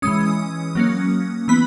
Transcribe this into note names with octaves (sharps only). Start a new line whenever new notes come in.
E3 G#3 C#4 D#6
F#3 A#3 C#4
E3 B3 B5